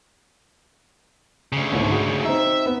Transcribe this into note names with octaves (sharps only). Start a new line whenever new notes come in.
D2 C#3
G1 C2 G#2
F#4 G#4
C4 D#4 E5
B3